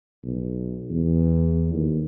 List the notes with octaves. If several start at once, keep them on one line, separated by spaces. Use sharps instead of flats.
B1
E2
D#2